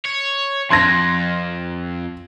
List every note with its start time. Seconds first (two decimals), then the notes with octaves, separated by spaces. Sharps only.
0.05 C#5
0.70 F2 C6 G#6 A#6